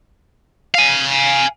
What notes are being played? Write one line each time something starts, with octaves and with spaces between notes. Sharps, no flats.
F5 G#5